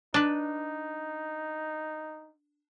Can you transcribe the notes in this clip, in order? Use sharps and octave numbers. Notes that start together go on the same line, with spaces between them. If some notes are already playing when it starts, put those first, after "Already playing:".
D4 D#4 B4